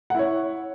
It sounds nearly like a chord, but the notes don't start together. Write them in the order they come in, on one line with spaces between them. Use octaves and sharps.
F#5 E4 C#5